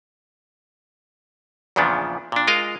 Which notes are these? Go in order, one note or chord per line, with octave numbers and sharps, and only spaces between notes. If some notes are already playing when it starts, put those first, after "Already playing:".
E2 A#2 C#3 F3 B3 D4
A#2 D4
G#3 F4 A#4 D#5 F5